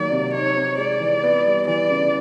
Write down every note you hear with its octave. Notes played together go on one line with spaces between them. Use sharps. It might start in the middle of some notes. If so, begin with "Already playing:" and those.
Already playing: D#3 F#3 A#3 D5
C3
D#4 C#5
C4
G#3 D5
E3
B3
G3
E3 D5
C#3